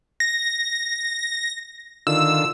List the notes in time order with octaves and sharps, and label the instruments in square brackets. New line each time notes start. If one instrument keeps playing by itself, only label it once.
[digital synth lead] A#6
[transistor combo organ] D3 D#3 F4 [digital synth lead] E6